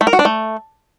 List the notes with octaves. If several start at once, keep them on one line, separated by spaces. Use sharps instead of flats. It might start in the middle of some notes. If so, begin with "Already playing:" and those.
A3
A#4
F#4
D4
A3